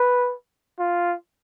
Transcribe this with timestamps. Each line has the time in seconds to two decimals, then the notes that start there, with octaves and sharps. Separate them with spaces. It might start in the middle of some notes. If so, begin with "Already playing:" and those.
Already playing: B4
0.79 F4